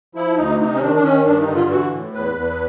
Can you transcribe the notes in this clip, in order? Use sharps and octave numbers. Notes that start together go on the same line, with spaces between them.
F3 E4
D2 D#4
C3 D#4
C#4
D#3 D4
D4
D#3 C#4
G2 D4
D#4
D3
F4
E3 F#4
A2
E2 B4
E2